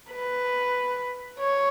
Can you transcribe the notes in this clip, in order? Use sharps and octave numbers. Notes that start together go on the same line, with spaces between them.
B4
C#5